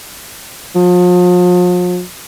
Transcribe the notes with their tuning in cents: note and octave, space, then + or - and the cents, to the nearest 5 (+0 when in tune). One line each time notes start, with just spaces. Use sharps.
F3 +40